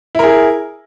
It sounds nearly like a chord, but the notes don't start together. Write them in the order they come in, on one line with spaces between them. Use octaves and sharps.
E4 A#4 G#4